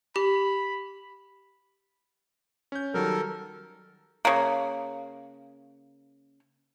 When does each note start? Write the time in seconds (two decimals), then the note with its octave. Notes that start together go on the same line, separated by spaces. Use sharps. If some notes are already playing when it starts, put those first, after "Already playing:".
0.16 G4 B5
2.72 C#4 G6
2.94 D#3 F#3 G3 A4 A#4
4.25 C#3 A#3